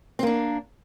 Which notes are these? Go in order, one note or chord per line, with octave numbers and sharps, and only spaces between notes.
A#3 C4 D4